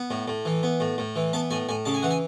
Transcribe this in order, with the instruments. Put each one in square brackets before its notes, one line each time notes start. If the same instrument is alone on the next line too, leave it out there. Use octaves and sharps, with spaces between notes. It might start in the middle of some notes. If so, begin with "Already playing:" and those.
Already playing: [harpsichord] B3
A2
A2
E3
B3
A2
A2
E3
B3 A5
A2 G#5
A2 G#5
C#3 A5
G#5
E3 F#5
G#5